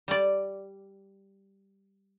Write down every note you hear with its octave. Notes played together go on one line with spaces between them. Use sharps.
G3 D5